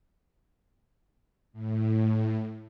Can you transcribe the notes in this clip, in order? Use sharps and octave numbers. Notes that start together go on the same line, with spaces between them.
A2